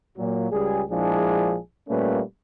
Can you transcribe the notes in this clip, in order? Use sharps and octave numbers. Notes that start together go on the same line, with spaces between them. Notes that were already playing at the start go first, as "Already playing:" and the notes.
A#2 F#3
C#2 G3 G4 G#4
A#1 F3 G#3 D4 E4 G#4
A#2 G3 A3 A#3 C#4 B4